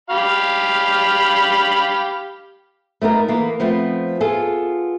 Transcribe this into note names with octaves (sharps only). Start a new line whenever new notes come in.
G4 F5 B5
A3 B3 D#4 A#4
E3 A#3 B3
F3 A3 B3 C4
B3 F4 G#4 A4